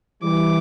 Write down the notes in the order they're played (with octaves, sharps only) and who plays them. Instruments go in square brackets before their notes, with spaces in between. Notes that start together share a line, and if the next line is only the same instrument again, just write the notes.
[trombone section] E3 G3 [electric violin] D6